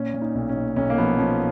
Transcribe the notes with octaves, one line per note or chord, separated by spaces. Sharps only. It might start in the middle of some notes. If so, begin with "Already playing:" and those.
Already playing: A#2 C#4
A#2
D#4
B1
C#4
A#2
B1 C#4
A#3
F3 B3
F3 C#4